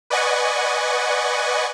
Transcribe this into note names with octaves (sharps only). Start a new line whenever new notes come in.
B4 D5 D#5 F#5 G#5 C#6